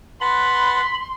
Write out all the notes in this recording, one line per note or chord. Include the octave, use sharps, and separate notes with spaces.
B4 F#5 A5 B5 C6